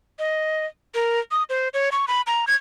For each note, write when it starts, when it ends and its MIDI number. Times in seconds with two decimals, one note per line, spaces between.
0.19 0.66 75
0.94 1.19 70
1.31 1.43 87
1.49 1.69 72
1.74 1.89 73
1.92 2.05 85
2.08 2.21 83
2.27 2.45 82
2.47 2.55 92